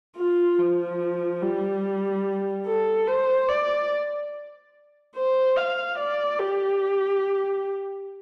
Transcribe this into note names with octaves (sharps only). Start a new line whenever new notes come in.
F4
F3
G3
A4
C5
D5
C5
F5
D5
G4